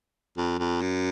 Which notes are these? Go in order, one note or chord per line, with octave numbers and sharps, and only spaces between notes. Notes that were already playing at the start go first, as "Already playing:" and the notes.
F2
F2
F#2